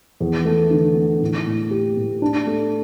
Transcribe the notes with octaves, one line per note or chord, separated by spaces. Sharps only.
E2
A3
D3
A3
A2
A2
G4
A2
D4
A3